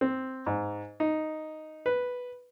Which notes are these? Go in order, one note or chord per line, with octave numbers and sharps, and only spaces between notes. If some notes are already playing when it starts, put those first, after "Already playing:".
C4
G#2
D#4
B4